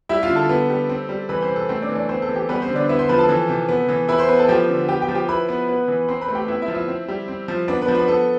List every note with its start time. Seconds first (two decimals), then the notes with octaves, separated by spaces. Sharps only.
0.09 G3 E4 E5
0.23 F4 F5
0.30 D3
0.36 A4 A5
0.49 B3
0.70 G3
0.89 C4
1.09 G3
1.29 E3 B4 B5
1.42 C4 C5
1.49 C3
1.56 A4
1.69 A3 C4 C5
1.82 D4 D5
1.89 E3
1.96 D4 D5
2.09 B3 C4 C5
2.22 A4
2.29 E3
2.36 G4
2.49 G3 B3 B4
2.62 C4 C5
2.69 D3
2.75 D4 D5
2.89 B3 E4 E5
2.99 C5 C6
3.09 F3 B4 B5
3.18 A4 A5
3.29 E3
3.49 C3
3.69 B3
3.89 E3
4.09 E4 B4 B5
4.18 C5 C6
4.28 B3 B4 B5
4.39 A4 A5
4.48 F3 G4 G5
4.69 D3
4.88 B3 G4 G5
5.02 G4 G5
5.08 F3
5.15 G4 G5
5.28 E4 B4 B5
5.49 B3
5.69 B3
5.88 E3
6.08 C4 C5 C6
6.21 B4 B5
6.28 A3
6.35 G4 G5
6.48 B3 E4 E5
6.62 E4 E5
6.68 F3
6.75 E4 E5
6.88 C4
7.08 G3
7.28 C4
7.48 F3
7.68 B3 D4 D5
7.82 B3 B4
7.88 F3
7.95 B3 B4
8.08 B3 A4